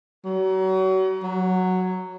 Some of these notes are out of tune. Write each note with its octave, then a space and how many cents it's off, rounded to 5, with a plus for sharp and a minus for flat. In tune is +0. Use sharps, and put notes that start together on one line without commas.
F#3 +35
F#3 +0